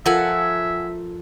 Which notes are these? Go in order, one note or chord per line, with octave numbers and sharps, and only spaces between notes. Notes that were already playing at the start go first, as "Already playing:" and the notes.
F3 A4 A#4 E5 F#5 G#5